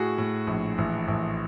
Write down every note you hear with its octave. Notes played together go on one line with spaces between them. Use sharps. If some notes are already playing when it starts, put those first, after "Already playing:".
Already playing: A2 F#4 G#4
A2
A#1
A1
A1